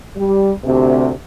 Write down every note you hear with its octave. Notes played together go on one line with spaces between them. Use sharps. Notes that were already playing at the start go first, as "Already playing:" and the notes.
G3
D2 C3